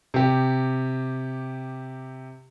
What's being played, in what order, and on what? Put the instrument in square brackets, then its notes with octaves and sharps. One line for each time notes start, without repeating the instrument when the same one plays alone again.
[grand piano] C3 G4